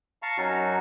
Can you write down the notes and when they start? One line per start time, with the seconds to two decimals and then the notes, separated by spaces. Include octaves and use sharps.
0.23 F5 A5 A#5 C#6
0.38 F#2 F#3 C#4 D#4 F#4